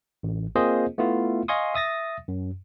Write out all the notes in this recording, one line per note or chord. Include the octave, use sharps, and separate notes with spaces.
A1
A#3 C4 F4 G#4 C5 D#5
A3 B3 E4 F4
D#5 F5 G#5 C6 C#6 D#6
E5 D#6 A6 A#6
F#2